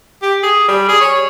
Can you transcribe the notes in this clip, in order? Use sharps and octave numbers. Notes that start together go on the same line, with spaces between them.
G4
G#4
G3
G#4
C#5